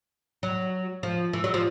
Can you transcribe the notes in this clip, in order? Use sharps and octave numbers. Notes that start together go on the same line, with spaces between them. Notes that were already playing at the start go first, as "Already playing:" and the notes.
F#3
F3
E3
F#3
F3